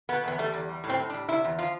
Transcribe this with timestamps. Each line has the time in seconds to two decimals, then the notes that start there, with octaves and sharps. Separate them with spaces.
0.09 B2 B3
0.24 E2 B3
0.38 G3 A3
0.54 E2
0.69 G3
0.84 A2
0.89 C4
1.00 A2
1.10 D4
1.14 G3
1.28 C3 E4
1.44 E2
1.58 F3 F4